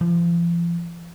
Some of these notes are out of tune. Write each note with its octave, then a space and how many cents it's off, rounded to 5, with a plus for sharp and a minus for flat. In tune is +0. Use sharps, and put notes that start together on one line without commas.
F3 -40